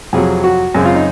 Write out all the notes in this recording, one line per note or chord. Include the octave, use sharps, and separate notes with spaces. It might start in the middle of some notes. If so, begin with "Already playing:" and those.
F2 C3 F#3 G#4
F#4
F#2 C#3 G#3 C4
F4
D#4